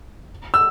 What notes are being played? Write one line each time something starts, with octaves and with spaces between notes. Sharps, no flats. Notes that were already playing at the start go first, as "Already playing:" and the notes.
E6